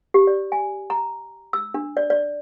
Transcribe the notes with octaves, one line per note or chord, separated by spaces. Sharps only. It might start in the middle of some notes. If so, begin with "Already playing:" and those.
G4
D5
G#5
A#5
E6
D4
D5
D5